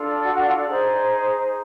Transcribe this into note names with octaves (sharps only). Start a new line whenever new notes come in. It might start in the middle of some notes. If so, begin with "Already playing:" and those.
Already playing: D4 F4 A4
D5
F#4 F#5
F#4 F#5
F4 F5
D5
D#4 G#4 C5